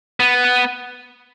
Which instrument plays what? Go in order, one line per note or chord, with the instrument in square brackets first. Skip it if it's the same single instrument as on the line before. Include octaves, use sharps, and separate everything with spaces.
[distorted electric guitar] B3